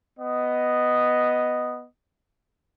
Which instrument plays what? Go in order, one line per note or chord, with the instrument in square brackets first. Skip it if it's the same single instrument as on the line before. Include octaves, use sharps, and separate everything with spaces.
[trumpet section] B3 D#5